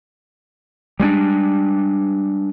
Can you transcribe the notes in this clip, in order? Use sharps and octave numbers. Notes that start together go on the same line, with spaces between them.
G3 G#3 B3 D4